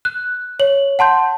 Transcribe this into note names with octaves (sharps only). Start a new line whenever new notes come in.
F#6
C#5 F#7
F#5 A5 C6 G6